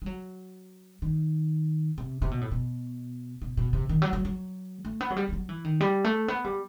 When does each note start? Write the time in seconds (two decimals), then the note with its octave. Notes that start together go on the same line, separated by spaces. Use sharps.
0.02 G3
0.06 F#3
1.02 D#3
1.98 C3
2.22 C3
2.31 B2
2.41 A2
2.52 B2
3.42 B2
3.57 B2
3.73 C3
3.89 D#3
4.02 F#3
4.13 F#3
4.25 F#3
4.85 A3
5.01 B3
5.10 F#3
5.17 G3
5.29 G3
5.33 F#3
5.49 E3
5.65 D#3
5.81 G3
6.05 A3
6.28 B3
6.45 G3